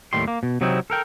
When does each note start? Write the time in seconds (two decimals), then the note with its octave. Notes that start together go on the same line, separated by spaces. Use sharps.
0.13 D#2 A2 D#3 G3 C6
0.28 A#3
0.43 B2
0.61 C3 F#3 C4 D#4 E4
0.90 A4 A#4 G5